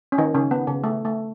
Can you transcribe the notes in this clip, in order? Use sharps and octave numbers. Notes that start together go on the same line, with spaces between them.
C#4
D#3 D#4
C#3 C#4
B3
C#3
A3
A3